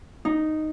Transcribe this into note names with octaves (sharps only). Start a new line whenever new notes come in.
D#4